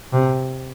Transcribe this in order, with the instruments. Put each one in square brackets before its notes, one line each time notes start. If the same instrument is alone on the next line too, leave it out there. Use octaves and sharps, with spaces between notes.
[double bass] C3